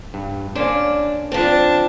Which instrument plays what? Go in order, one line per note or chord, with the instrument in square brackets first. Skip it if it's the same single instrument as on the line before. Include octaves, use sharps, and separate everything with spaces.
[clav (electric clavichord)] G2
[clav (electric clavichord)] A#3 C#4 C5 [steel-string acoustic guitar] D4
[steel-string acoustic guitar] F3 C4 [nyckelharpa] D4 A5